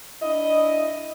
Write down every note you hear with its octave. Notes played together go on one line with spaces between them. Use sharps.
D4 E4 D#5